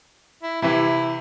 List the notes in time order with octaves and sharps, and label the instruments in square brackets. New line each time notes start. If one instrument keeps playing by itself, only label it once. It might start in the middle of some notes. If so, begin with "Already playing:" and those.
[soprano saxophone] E4
[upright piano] C3 E3 [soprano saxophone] E4